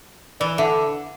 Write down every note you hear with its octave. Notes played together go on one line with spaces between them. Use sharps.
E3 D5
D3 E5